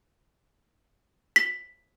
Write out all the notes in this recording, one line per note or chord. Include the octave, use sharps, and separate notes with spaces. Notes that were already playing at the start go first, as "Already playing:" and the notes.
B6